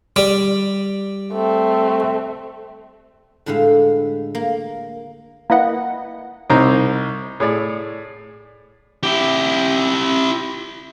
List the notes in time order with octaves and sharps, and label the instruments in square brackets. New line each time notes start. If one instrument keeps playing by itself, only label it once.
[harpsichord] G3
[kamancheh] A3 C4
[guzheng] A2 D3 G#3 E5 F5
A#3
[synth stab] A#3 E4 B4 D#5 F#5
[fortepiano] C2 C3 D#4 C5 A#5
A2 G#4 C#5 D5
[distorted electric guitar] E4 G4